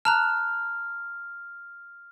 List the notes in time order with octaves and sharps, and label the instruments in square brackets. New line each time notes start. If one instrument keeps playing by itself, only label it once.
[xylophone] A5 A#5 F#6 [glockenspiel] F6